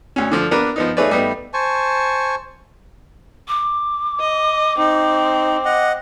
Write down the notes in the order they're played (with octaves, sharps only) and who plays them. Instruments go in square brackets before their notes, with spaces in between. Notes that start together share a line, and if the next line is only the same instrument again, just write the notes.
[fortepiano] D2 C#4
D3 F3
A#3 B3 D4 A#4 B4
F3 B3 D#4
A3 D#4 G#4 B4 C#5 D5
G3 A3 B3 D#4
[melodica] C5 G#5 A5 C#6
[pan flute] D6
[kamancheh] D#5
[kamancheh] C4 [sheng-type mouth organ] D#4
[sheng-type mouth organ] D#5 F#5